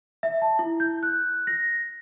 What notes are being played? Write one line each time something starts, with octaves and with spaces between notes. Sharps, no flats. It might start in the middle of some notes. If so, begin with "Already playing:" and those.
E5
A5
E4
G6
F#6
A#6